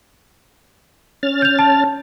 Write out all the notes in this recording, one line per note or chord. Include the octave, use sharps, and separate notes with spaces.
C#4 F6 A6
G6 F7
A5